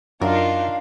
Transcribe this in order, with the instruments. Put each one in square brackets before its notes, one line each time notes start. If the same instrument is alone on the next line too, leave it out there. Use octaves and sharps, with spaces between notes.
[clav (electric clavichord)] F#2 [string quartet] D4 D#4 F4 [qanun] A#4 [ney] F5